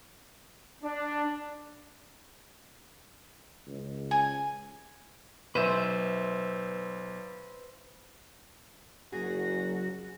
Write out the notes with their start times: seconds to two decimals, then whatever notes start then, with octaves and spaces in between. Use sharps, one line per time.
0.83 D4
3.67 C#2
4.11 G#5
5.55 B1 B4 C5 E5 D#7 E7
9.12 F#1 F#3 F#4 G#4 A#6